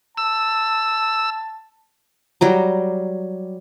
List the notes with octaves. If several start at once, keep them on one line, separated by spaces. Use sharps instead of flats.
A5 E6
F#3 G3 A#5